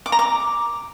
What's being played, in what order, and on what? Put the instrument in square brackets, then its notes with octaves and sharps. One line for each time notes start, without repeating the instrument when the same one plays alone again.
[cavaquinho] D6
A#5
D6